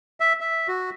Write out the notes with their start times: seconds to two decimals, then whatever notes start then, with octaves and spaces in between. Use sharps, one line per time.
0.20 E5
0.40 E5
0.68 F#4